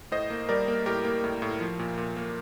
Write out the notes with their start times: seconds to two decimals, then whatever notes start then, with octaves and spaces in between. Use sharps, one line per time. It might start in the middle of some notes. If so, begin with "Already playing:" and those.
0.12 A2 C5 D#5
0.30 A#3
0.49 G3 A#4 D5
0.68 A#3
0.86 A2 G4 A#4
1.05 A#3
1.24 A2
1.42 A2
1.61 F3
1.79 A#2
1.98 A#2
2.17 A#3